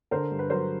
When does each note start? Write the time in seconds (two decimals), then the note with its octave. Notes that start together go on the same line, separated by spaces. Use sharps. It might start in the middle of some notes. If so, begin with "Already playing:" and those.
0.11 D3 A#4 C5
0.31 G2
0.39 B4
0.50 F#3 A#4 C5